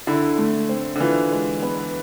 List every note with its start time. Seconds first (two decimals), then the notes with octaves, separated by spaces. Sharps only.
0.07 D3 E4
0.38 A3
0.69 C4
0.95 D3
1.00 E3 F4
1.31 G#3
1.62 B3